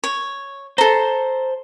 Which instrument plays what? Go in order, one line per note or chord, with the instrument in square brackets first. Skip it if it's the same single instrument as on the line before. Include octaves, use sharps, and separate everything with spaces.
[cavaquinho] C#5
[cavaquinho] A4 A#5 [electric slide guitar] C5